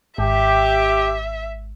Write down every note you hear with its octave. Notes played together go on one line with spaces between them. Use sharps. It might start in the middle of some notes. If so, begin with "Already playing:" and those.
G#1 G4 E5